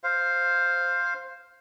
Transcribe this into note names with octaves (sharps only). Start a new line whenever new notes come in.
C5 F5